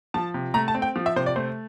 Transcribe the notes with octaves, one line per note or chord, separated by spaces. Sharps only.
F3 A5
C3
A3 A#5
A5
C4
G5
F3
E5
C3 C5
D5
A3 C5